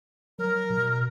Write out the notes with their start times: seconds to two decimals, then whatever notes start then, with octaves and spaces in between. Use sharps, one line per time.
0.39 F#3 A#4
0.70 B2